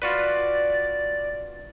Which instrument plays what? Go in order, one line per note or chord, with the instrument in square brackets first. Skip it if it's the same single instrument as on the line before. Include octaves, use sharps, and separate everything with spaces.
[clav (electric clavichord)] F4 F#4 B4 [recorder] D5